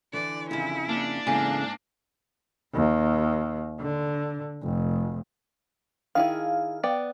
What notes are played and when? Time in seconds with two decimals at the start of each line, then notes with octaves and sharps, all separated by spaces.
0.13 D3 E3 D5
0.51 F2 C#3 E4
0.89 A#3 D4
1.27 E2 G#2 C#3 A#3 A4 G#5
2.74 D#2
3.80 D3
4.63 F1
6.15 D#3 E4 G#4 F5
6.83 B3 D5 G5